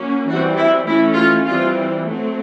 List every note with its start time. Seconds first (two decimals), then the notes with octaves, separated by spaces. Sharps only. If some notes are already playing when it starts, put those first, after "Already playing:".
Already playing: F#3 A#3 C#4
0.28 E3 G3 C4 F#4
0.57 E4
0.87 E3 A3 C#4 E4
1.16 F4
1.45 E3 G3 C4 F4
2.05 F#3 A3 C4